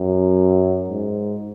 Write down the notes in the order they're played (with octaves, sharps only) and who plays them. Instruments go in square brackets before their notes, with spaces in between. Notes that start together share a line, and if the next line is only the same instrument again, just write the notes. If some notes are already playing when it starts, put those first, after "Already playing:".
Already playing: [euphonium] F#2
G#2